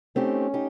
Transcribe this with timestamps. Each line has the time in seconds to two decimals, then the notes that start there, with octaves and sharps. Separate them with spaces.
0.16 A3 C4 C#4 D#4 G4
0.54 D#4 G4